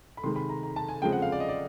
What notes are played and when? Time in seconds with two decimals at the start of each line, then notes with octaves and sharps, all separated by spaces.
0.17 B5
0.23 C3 D#3 G#3 C6
0.36 B5
0.49 A#5
0.63 A#5
0.76 A5
0.89 G#5
1.02 C#3 F3 G#3 C4 G5
1.12 F#5
1.22 F5
1.32 D5
1.40 D#5
1.49 D5